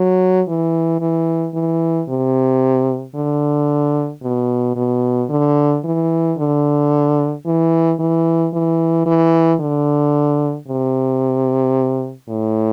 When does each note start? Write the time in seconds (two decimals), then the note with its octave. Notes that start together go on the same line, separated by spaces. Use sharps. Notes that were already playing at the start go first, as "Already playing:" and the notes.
Already playing: F#3
0.48 E3
1.00 E3
1.54 E3
2.09 C3
3.15 D3
4.23 B2
4.76 B2
5.30 D3
5.84 E3
6.38 D3
7.46 E3
7.99 E3
8.53 E3
9.06 E3
9.60 D3
10.68 C3
12.29 A2